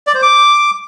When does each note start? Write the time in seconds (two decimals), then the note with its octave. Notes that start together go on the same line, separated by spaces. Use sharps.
0.07 D5
0.15 C5
0.22 D6